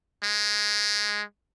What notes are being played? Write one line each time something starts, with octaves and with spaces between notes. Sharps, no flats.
G#3